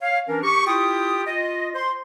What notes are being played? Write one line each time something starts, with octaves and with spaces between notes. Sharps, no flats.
C#5 F5
E3 C#4 D4 A#4
G4 C#6
E4 F4 G4 G5 D#6
F4 D#5
C5 C6